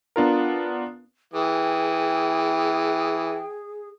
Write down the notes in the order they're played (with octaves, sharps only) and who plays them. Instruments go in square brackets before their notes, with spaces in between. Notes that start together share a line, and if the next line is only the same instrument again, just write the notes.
[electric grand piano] B3 D4 F4 A#4
[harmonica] E3 D#6 [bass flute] G#4 [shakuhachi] G5